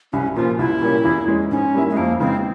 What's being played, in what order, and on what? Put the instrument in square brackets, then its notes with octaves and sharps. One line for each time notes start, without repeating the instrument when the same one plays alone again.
[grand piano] C2 [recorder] C#4
[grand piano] A#2 F3 [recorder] F4
[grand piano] C2 [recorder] E4
[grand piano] A#2 G3 A#3 C#4
E2
E3 G#3 C#4
[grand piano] G#2 [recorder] C#4
[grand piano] G3 A#3 E4
[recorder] G#3
[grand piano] F2 [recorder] A#3
[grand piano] C#3 E3 G#3 [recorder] C4